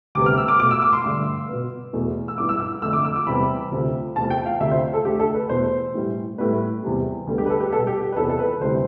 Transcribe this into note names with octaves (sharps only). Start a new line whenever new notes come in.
D2 C3 G3 B3 D6
F6
E6
D6
B2 A3 D6
E6
D6
C6
G2 D3 A3 C6
B2 B3
E2 B2 A3
E6
G2 E3 B3 D6
E6
E6
F2 D3 A3 E6
D6
E6
D6
E2 C3 G3 B3 B5
D2 C3 F3
E2 C3 F3 A3 A5
G5
F5
D2 C3 F3 E5
C5
A4
D2 D3 A3 G4
A4
B4
E2 B2 A3 C5
A2 E3 G3
A2 G3 B3 B4
E2 C3 G3
D2 D3 G3 B3
G4
B4
A4
G4
B2 G3 B3 A4
G4
G4
B4
E2 C3 F3 A4
A4
B4
D2 C3 E3 G3 C5